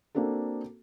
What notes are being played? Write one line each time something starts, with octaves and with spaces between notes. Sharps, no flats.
A#3 C4 D4 F#4 A4